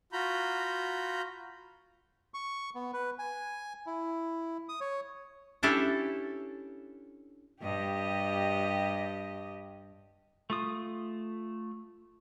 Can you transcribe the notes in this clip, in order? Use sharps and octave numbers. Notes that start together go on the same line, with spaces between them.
F4 F#4 A#5 B5 G6
C#6
B3
B4
G#5
E4
D#6
C#5
C#4 D4 E4 G4 A4
G2 G4 D#5
A3 F4 D#6